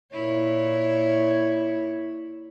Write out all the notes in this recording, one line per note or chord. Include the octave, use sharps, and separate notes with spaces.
A#2 E4 C#5